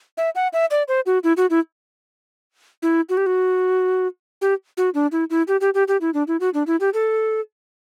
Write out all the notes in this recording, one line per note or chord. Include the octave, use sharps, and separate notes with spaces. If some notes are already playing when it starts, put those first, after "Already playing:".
E5
F#5
E5
D5
C5
F#4
E4
F#4
E4
E4
F#4
G4
F#4
G4
F#4
D4
E4
E4
G4
G4
G4
G4
E4
D4
E4
F#4
D4
E4
G4
A4